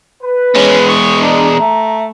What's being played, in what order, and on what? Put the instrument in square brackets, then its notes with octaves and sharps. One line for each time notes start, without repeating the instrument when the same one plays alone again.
[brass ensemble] B4
[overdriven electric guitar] E2 G#3 [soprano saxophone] C#4
[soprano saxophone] C#6
[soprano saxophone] D4 [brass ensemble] A#5
[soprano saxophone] A3